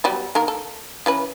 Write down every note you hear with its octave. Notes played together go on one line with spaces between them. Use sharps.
F#3 G3 B3
D#3 A#3 A#4
A4
E3 C#4 B4